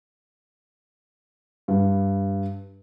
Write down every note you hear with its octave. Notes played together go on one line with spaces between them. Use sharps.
G2